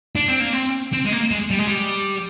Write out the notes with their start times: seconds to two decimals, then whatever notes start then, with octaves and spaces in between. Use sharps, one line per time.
0.16 D4
0.28 C4
0.40 A#3
0.53 C4
0.93 C4
1.05 G#3
1.12 A#3
1.31 G#3
1.51 G3
1.59 G#3
1.68 G3